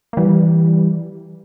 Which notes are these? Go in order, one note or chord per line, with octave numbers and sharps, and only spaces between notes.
A#3
E3 G3